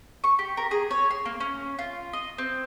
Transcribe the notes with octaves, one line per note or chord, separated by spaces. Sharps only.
C#6
G4
A#4
G#4
C#5
C6
A#3
C#4
F4
D#5
C4